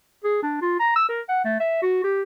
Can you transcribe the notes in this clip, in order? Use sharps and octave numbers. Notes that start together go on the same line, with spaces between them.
G#4
D4
F4
A#5
E6
A#4
F#5
A3
E5
F#4
G4